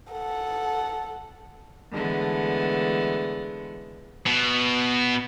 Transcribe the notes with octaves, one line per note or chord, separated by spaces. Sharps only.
A4 F#5
D3 E3 G#3 A3 B3
B2